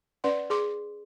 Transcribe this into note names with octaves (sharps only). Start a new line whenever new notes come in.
C#4 B4 D5 F#5 C6
G#4 C6 D6